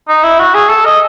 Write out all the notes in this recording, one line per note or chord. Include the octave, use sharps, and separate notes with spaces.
D#4
E4
F#4
G#4
A4
D#5